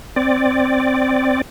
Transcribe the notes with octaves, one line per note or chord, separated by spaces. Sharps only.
C4 D5